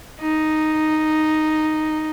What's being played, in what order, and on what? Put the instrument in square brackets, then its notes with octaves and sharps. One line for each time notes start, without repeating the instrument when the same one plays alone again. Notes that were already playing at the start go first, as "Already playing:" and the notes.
[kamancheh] D#4